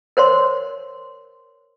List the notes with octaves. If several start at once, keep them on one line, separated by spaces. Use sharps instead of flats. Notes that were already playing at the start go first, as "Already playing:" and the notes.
A#4 C5 C#5 C6